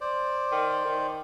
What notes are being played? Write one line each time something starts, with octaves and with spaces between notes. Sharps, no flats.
C5 D5
D#3
D#3